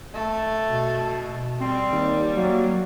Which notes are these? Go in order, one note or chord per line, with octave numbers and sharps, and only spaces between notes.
A3
B2
G3 C4
D#2
F#3 A#3